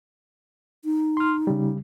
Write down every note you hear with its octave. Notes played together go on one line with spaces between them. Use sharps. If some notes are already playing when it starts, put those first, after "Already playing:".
D#4
C6 F6
C#3 G3